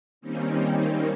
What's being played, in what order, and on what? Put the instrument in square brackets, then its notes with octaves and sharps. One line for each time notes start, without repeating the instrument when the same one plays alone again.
[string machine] D#3 G3 A#3 C4 C#4 D#4